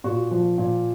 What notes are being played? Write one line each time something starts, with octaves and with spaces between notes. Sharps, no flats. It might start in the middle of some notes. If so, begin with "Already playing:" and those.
A#2 F#4
F3
A#2